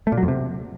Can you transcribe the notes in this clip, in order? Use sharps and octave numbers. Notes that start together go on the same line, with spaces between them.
A3
A#2
F#3
F2
C3